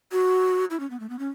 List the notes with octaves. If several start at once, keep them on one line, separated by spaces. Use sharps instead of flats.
F#4
E4
C#4
B3
A3
B3
C#4